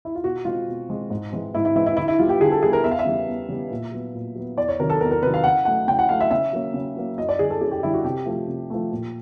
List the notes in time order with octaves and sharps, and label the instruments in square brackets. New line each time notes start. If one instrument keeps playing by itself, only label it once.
[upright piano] E4
F4
B2 F#4
G#3 C4 F4
B2
G#3 C4
G#2
E3 G#3 C4
G#2 E4
E4
E3 G#3 C4 E4
E4
D3 E4
E4
G3 B3 F4
G4
D3 G#4
A4
G3 B3 G#4
A#4
E2 E5
F5
E5
C#3 E3 G3 B3
E2
C#3 E3 G3 B3
A#2
F#3 B3
A#2
F#3 B3
E2 D5
C#5
C3 D#3 F#3 A#4
A4
E2 A#4
A#4
C3 D#3 F#3 B4
F5
C#3 F#5
F#3 A3 F#5
C#3 G5
F#5
F#3 A3 F5
E5
C#3 E5
F#3 A#3 C#4
C#3
F#3 A#3 C#4
F#2 D#5
D5
D3 G3 G#4
A4
F#2 G#4
G4
D3 G3 E4
F#4
C3 G4
F3 A3
C3
F3 A3
A#2